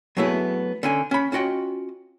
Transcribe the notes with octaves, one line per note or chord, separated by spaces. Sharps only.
F#3 A3 B3 E4 G#4
D3 C#4 G#5
C#4 B5
C#4 F4 F#4 D#5 G5